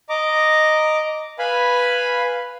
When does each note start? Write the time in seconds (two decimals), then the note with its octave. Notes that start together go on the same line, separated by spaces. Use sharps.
0.09 D#5 A#5 D6
1.39 B4 F5 G#5 B5